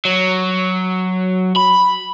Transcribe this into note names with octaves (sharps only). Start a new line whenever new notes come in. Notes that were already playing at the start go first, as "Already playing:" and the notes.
F#3
B5